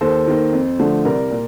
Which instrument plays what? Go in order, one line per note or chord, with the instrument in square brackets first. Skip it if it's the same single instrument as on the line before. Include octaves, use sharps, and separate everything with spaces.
[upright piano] D#2 A4 C5
D#3 A#3
F2
D3 F3 A3
C2 A#4 D5
A#2